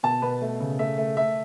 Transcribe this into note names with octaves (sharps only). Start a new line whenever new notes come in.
B2 A5
B2 B4
A3
C#3
A3 E5
A3
A3 E5